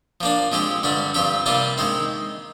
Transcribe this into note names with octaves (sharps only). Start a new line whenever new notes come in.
F3 A#3 D4
F3 G#3 C4 G4
G2 D3 G3 D4
G2 F3 C4 G4
C3 G3 A#3 F4
D#3 G#3 C4